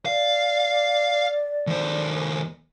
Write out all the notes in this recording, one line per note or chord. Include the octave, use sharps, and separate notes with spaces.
D5 F5
D#2 C5